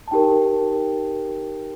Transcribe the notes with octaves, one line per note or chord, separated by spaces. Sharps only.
A5
D#4 G4 A#4 G5